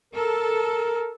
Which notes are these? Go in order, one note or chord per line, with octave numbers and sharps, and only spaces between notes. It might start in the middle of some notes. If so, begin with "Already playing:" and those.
A4 A#4